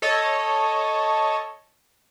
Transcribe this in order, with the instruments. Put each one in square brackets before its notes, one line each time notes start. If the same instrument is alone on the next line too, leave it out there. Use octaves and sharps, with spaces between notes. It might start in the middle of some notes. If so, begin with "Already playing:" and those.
[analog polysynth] A4 C#5 D#5